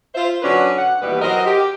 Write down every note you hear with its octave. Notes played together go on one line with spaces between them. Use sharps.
F4 C5 E5
D3 F#3 C#4 D4 F#4 B4
F#5
D#2 B2 E3 G3 G4 B4
F#3 A#4 C5 D#5
G4